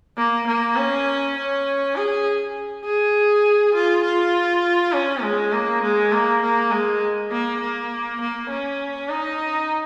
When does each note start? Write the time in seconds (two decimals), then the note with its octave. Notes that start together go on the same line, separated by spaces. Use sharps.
0.17 A#3
0.47 A#3
0.77 C#4
1.37 C#4
1.96 G#4
2.85 G#4
3.75 F4
4.04 F4
4.93 C#4
5.23 G#3
5.53 A#3
5.83 G#3
6.12 A#3
6.42 A#3
6.71 G#3
7.31 A#3
7.60 A#3
8.21 A#3
8.49 C#4
9.10 D#4